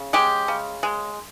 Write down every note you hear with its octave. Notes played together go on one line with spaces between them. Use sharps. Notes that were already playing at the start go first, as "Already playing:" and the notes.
Already playing: C#3
G#3 G4
C#3
G#3